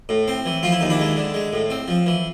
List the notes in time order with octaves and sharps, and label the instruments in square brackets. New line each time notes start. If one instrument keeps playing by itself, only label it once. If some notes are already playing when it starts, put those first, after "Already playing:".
[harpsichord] A2
C4
E3
F3 F4
E4
D#2 D#4
D4 E4
G#3
D3
G#3
A2
C4
F3
E3